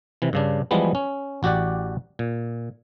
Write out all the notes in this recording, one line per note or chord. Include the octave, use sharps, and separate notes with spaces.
C3 E3
G2 C#3 D4
E3 F3 G3 G#3 B3
C#4
A1 F#4 G4 D5 F#5
A#2